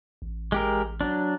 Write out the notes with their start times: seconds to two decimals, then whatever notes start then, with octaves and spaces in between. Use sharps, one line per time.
0.22 A1
0.52 G#3 G4 A#4
1.01 F#3 D4